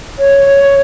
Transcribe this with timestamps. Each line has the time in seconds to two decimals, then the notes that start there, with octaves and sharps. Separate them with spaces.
0.18 C#5
0.45 C#5